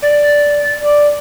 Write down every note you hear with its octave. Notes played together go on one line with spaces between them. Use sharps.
D5
D5